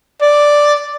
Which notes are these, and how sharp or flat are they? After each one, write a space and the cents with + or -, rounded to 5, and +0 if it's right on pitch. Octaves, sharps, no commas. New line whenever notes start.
D5 +0